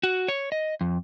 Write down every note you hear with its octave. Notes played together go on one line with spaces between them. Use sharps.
F#4
C#5
D#5
F2